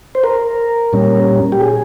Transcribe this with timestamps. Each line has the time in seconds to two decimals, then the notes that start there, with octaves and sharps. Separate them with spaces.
0.15 C5
0.24 A#4
0.93 A#2 G3 C#4
1.52 G4
1.61 G#4